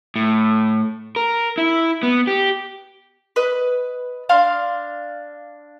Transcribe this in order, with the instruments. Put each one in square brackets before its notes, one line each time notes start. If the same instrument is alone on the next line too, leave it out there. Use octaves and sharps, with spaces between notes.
[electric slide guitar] A2
A#4
E4
B3
G4
[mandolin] B4 D#5
D4 F5 C6